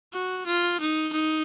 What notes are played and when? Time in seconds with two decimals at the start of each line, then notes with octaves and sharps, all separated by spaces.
0.13 F#4
0.47 F4
0.80 D#4
1.13 D#4